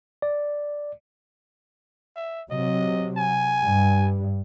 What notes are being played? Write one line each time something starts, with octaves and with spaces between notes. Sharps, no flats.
D5
E5
C3 F#3 D#5
G#5
G2